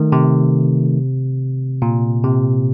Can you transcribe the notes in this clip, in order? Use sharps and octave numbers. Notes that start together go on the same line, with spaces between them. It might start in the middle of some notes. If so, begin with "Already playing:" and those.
Already playing: D#3 A3
C3
A#2
C3